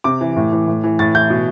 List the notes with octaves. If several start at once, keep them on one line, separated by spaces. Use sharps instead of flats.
C3 D6
E3
A2
E3
A2
E3
A2 A6
E3 G6
B2